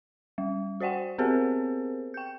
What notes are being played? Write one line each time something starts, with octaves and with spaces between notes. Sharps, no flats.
G3
F#4 C5 D5 F#5 G5
B3 C4 G4 G#4 A#4 C5
G5 G6